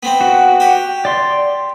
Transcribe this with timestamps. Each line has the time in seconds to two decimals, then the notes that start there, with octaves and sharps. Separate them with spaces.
0.03 B3 C4
0.21 F#4
0.60 G4
1.05 D5 C6